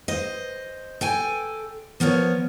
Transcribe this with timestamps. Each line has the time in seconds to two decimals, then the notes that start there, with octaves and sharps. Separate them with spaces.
0.08 C5 D#5
1.01 A4 G5 G#5
2.00 F3 B3 A#4 C#5